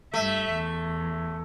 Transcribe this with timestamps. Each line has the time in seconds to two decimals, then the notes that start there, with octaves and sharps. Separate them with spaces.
0.14 G2 A3 E5
0.51 E2